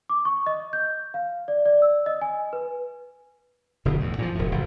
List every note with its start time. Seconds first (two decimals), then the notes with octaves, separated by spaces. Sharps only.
0.09 D6
0.25 C#6
0.47 D#5
0.73 G6
1.14 F5
1.48 D5
1.66 D5
1.82 E6
2.06 D#5
2.21 G#5
2.53 B4
3.85 F1 B2 D3
3.99 E2 A2
4.18 A#2 C#3 F3
4.35 E1 A2
4.51 F#1 A2